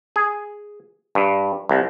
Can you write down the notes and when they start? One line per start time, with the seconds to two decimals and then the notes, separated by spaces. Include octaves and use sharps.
0.16 G#4
1.15 G2
1.69 C2